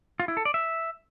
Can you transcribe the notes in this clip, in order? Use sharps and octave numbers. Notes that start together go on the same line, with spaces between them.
F4
E4
A4
D5
E5